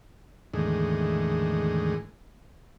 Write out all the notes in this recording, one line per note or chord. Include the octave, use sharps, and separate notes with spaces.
E2 A2 D3 D#3 G#3